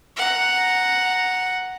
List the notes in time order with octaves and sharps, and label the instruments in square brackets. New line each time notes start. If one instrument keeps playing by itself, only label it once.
[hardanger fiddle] F#5 A#5